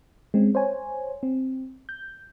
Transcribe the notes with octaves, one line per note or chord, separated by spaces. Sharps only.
G#3 C4 C#4
C5 C#5 G#5
C4
G6